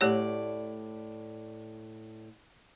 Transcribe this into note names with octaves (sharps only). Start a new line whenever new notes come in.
A2 A3 G4 C#5 D5